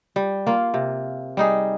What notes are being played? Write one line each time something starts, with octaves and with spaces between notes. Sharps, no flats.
G3
A#3 F4
C3
G3 D#4 G#4